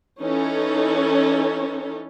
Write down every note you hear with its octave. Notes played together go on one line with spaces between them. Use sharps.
E3 C#4 D#4 A4 C#5